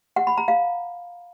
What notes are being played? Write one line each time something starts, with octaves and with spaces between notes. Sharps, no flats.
F#5
B5
A#5
F5